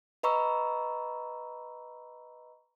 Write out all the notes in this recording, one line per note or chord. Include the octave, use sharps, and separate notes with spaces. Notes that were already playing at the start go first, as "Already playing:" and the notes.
B4 D#5 A#5 B5 C#6 E6